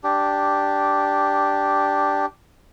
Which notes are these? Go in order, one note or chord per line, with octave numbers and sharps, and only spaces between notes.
D4 G4